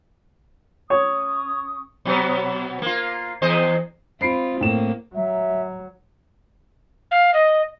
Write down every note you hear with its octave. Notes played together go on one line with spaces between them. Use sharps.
C#4 C#5 C#6 D#6
B2 F#3 B3
A#3 F4
E2 C5 D#5
G#3 C4 F4 B5 C7 D7
A2 A#3 E7
F#3 E5
F5
D#5